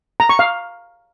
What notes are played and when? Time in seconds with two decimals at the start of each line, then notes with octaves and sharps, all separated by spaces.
0.20 A#5
0.29 C#6
0.39 F5